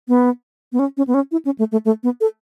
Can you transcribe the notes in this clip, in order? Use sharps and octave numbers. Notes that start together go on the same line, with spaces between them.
B3
B3
C#4
C#4
B3
C#4
E4
C#4
A3
A3
A3
B3
A4